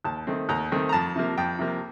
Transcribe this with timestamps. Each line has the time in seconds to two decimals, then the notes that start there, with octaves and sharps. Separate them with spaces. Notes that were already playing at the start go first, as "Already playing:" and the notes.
0.04 D#2 A5
0.27 D#3 A3 C4
0.49 D#2 A#5
0.72 D#3 A3 C4
0.89 A#5
0.93 F2 A5
1.16 C3 F3 A#3
1.38 F2 G5
1.59 C3 F3 A#3